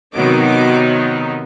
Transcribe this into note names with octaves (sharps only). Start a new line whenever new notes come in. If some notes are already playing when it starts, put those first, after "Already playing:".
C3 D#3 F#3 B3 D#4 D6
D6